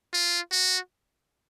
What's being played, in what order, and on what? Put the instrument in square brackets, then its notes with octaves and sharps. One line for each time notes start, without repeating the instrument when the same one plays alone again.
[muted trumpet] F4
F#4